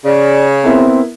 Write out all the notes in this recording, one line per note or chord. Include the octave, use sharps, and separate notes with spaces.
C#3 D5
B3 C4 E4 A#4